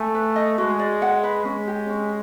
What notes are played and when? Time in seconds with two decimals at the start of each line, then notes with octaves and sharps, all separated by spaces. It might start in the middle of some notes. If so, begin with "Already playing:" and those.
Already playing: A3 G#5
0.15 B4
0.36 D#5
0.58 G#3 F#4
0.79 D5
1.02 F#5
1.23 B4
1.45 G#3 C#4
1.67 G4
1.89 C#4